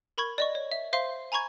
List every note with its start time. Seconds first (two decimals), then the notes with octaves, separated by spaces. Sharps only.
0.18 A#4 B5 C#6 G#6
0.38 D5 D#5 C#6
0.55 C#5
0.72 E5
0.93 C5 E5 F5 C6
1.32 G#5 A#5 B5 C#6 G#6